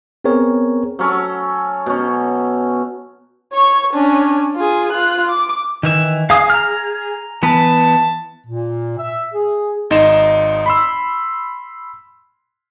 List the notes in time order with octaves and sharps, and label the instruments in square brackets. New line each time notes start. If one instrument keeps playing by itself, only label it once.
[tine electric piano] B3 C4 G#4 A#4 C#5
[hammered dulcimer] F#3 C#4 A4
B2 C#4
[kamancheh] C#5 C#6
C#4 D4
F4 G#4
F4 F#6
D6
[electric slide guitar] D#3 E3 E5
[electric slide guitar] G#4 [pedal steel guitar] F5 D#6
[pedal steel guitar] A#5 F6
[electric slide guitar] E3 B3 B4 [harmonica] A5
[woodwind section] A#2
E5
G#4
[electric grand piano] G#1 D#4 D#5 C6 E7
B5 C6 E6